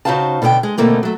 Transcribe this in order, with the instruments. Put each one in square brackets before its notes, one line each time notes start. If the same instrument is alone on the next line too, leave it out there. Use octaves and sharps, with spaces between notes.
[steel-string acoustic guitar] C#3 D#4 F#4 C5 F5 A5
B2 D3 B3 C#5 G5
G#3
B2 D3 D#3 A3 A#3 C4
F#3 A3